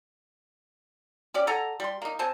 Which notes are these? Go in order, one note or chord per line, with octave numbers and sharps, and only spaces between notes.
C#4 G4 D5
A4 F#5 G#5 A#5
G3 C6
A#3 D#4
C3 C5 G#5 A5